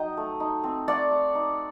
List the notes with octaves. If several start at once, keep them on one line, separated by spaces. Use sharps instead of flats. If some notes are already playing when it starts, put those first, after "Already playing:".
Already playing: F#3 D#4 D#5 G5
A3
D#4
C4
A3 D5 F#5
A3
D#4